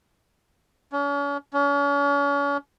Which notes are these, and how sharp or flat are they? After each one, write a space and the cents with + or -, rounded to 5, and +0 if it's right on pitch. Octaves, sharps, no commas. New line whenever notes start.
C#4 +40
C#4 +40